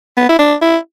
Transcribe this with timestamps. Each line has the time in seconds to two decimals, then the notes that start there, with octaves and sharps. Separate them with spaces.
0.17 B3
0.29 E4
0.39 D4
0.62 E4